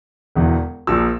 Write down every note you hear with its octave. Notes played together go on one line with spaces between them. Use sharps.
E1 E2 E3
A#1 A#2 F3 E6